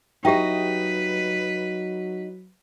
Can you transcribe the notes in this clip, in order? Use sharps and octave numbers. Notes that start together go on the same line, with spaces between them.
F#3 D#4 G4 B4 D#5 E5 G5